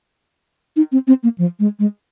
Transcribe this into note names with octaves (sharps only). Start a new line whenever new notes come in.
D#4
C4
C4
A#3
F3
G#3
G#3